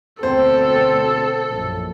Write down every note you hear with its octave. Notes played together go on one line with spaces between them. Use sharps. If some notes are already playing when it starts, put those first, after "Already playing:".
D2 B2 C4 A4 C5
A#1 F#2